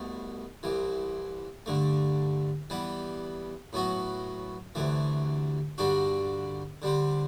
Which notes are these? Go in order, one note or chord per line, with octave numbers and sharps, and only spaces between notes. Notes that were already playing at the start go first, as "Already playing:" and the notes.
Already playing: C2 B2 A3
C2 C3 E3
G2 D3 A3
E3 G3 B3
A2 F#3 B3 F#4
D2 C3 E3 A3
G2 D3 G3 D4 F#4
D3 G3 C4